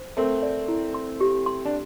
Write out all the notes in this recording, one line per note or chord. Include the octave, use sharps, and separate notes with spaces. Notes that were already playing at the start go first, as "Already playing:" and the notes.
Already playing: C5
A3 C4 A#4
D5
E4
C6
G4
C6
D4